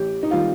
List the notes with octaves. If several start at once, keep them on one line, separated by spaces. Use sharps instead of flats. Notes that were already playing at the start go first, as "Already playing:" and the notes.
Already playing: A1 G4
D#4
D#3 G3 F4